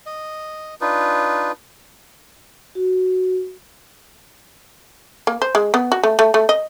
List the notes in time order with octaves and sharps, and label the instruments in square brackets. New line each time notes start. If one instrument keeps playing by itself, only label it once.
[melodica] D#5
D4 D#4 F4 B4
[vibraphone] F#4
[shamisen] A#3
C5
G#3
B3
F#4
A3
A3
A3
D#5